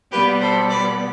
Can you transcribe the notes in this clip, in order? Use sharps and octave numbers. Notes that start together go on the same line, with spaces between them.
B2 G3 B3 G4 B4
A4 C5
B4 D5